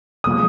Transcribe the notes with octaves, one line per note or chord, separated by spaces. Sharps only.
F3 G#3 D#6